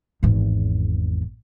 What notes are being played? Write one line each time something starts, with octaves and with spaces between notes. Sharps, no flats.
G#1 E2